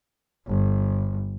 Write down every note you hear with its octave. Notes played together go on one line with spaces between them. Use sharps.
G1